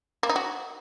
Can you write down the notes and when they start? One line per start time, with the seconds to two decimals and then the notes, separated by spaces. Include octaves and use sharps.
0.23 A#3
0.29 D#4
0.36 F#4